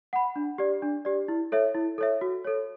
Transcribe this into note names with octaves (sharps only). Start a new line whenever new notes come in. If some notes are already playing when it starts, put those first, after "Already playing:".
F#5 B5
D4
G4 D5
D4
G4 D5
E4
A4 C#5 E5
E4
A4 C#5 E5
F#4
A4 C#5